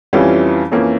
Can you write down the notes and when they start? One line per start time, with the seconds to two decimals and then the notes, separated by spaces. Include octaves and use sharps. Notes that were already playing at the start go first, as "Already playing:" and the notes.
0.13 F2 E3 G3 C#4 F4
0.72 F2 E3 A#3 C#4